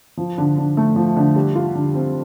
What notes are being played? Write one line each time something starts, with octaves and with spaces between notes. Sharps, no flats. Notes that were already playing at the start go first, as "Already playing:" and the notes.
F3
D3
D3
A3
F3
D3
G3
F4
D3
C4